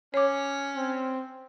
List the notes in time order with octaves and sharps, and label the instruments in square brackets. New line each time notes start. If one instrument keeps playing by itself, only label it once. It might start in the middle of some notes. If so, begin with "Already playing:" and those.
[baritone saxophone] C#4 [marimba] C#5 D6
[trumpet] C4